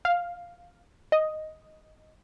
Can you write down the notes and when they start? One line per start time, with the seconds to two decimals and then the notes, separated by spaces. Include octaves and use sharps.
0.05 F5
1.12 D#5